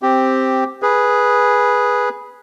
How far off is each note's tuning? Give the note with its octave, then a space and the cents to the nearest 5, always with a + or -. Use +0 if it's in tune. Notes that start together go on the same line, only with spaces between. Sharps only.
C4 +0 G4 +0
G#4 +0 B4 -10